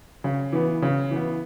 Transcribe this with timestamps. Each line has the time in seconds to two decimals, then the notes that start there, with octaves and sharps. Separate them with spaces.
0.24 C#3
0.53 E3 B3
0.82 C#3
1.11 E3 B3